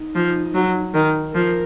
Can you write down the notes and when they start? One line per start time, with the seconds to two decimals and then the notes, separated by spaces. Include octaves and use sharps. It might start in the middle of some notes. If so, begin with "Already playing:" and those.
Already playing: D#4
0.15 F3
0.54 F#3
0.94 D#3
1.35 F3 A#4